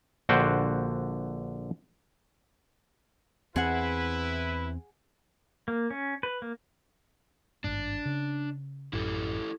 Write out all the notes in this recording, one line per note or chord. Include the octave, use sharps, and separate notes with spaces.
A#1 D3 F#4 C5 G5
E2 C4 E4 G#4 B4 F#5
A#3
C#4
B4
A#3
G#1 G2 D4
C#3
A1 F#2 E4 G4 A4